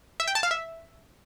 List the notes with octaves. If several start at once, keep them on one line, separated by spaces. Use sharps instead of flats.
E5
G5
A5
F5
E5